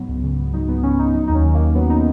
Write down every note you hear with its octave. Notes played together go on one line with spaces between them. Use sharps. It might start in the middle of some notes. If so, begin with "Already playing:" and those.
Already playing: G#2 F#3 B3
C#2
C#3
C#2
F#3 D#4
C#2 B3
C#3 C#4
C#2 D#4
F#3 D#4
D#2 D#4
C#4
D#3
A#3
D#2
F#3 B3
D#4